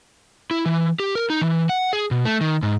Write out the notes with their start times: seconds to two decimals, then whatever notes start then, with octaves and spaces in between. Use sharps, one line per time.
0.51 E4
0.66 E3
1.00 G4
1.15 A#4
1.30 D#4
1.41 E3
1.69 F#5
1.93 G#4
2.11 B2
2.25 A3
2.41 D#3
2.63 G#2